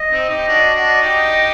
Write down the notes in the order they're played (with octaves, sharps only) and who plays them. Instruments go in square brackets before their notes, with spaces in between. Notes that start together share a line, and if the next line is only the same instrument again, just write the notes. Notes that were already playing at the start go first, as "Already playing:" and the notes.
Already playing: [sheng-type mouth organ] D#5
[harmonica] C4 D#4
D#4 G4
D4 F#4
D4 F#4
D#4 G4